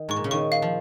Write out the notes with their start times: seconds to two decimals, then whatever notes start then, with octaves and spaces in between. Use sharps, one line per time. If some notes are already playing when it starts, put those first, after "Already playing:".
Already playing: D#3
0.09 G#2 C#6
0.16 A#2
0.24 C#3
0.31 D#3 C#6
0.52 F5
0.62 F3